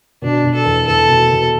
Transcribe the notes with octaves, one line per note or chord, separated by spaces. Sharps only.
B2 D4
B2
A4
E2
E2 A4
B2
B2